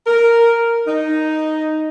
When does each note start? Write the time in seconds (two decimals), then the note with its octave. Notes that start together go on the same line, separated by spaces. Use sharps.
0.07 A#4
0.87 D#4